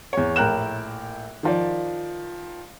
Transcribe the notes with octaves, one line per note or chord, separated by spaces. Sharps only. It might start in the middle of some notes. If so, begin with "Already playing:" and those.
E2 C#5
A#1 A2 A#4 G5 F#6 E7
D#3 F3 D5